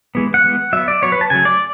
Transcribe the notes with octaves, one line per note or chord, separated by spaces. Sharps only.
E3 G#3 B3
F#5
E3 G#3 B3
F#3 B3 E5
D5
F#3 B3 C#5
B4
A5
C#3 F#3 A3 G#5
D5